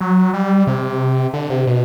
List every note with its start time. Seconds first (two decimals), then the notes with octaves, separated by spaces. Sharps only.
0.01 F#3
0.34 G3
0.67 C3
1.34 D3
1.50 C3
1.67 B2